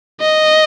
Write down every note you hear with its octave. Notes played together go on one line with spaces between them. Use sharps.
D#5